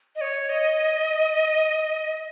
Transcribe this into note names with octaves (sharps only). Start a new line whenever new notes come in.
D#5
C#5
D#5